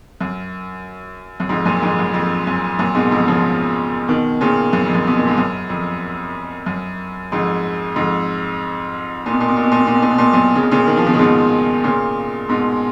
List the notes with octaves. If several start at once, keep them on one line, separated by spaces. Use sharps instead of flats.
F#2
F#2
F2 G#2
F#2 A#2
F2 G#2
F#2
F2
F#2
F#2 A#2
G#2 B2
F2 G#2
C#3 F3
B2 D#3
A#2 C#3
F#2
F2
F#2
B2
A#2
G#2
F#2
F2
F#2
F2 G#2
F2 G#2
A#2
B2
A#2
B2
A#2
B2
A#2
B2
A#2
B2
A#2
B2
A#2
B2
F#2 A#2
C#3
B2
A#2 C#3
D#3
F3
B2 D#3
C#3
G#2 B2
A#2 C#3
G#2 B2